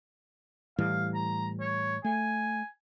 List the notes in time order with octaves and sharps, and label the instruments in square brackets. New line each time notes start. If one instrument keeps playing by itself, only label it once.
[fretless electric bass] A2 E3 G3 [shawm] F5
[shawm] A#5
C#5
[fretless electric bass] A3 [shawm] G#5